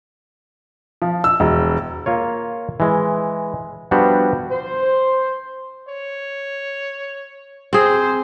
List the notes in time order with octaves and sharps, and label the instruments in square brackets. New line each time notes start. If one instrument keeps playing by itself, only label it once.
[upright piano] F3
E6
E1
[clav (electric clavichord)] A#3 F4 C#5
E3 G#3
F3 G3 B3 D4 F#4 G4
[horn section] C5
[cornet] C#5
[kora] C4 G#4 [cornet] C5